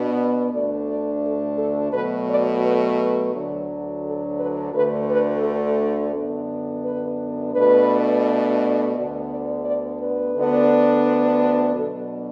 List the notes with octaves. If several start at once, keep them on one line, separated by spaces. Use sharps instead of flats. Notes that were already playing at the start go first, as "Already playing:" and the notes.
Already playing: B2 B3 D4
D2 D3 A3 D4 D5
D5
A4
A4
B2 F#3 A3 B4
D5
B4
B4
D2 D3 F#3 D4
A4
B4
D2 D3 A3 B4
B4
A4
F#2 D3 B3 D4
B4
B2 A3 D4 B4
D2 D3 B3 D4 D5
D5
D5
B4
D2 D3 B3 D4
B2 F#3 D4 A4